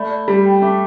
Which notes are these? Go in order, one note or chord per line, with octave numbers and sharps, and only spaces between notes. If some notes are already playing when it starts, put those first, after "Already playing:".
Already playing: A3 D5 B5
D5
G3 G4
G5
A3 D6